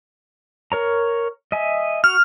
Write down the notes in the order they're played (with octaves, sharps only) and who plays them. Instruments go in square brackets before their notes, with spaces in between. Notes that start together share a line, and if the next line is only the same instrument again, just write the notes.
[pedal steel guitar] A#4 C#5 A#5
D#5 E5 G#5
[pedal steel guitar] F#4 [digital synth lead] F6